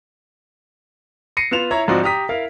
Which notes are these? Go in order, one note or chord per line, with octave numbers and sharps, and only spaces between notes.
A#6 C7 C#7 D#7
B3 F4 E7 F7
E4 C#5 A#5
G#2 F3 C4 D#4 F#4 D5
G4 A#5 D#6 B6
E4 A#4 F5